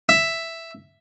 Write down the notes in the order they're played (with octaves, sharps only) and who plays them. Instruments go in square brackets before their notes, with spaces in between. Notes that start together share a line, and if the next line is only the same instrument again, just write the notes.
[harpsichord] E5